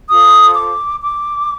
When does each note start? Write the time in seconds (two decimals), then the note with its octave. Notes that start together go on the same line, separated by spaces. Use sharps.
0.09 F4 A4 C5 D#6
0.55 D6
1.02 D6